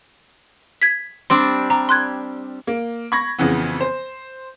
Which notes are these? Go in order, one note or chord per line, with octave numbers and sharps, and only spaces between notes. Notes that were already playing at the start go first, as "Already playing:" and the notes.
G#6 B6
G3 C4 D4 C6
G3 A#5
C6 F#6 G#6
A#3
B5 C#6 G#6 A#6
F2 C#3 E3 B3
C5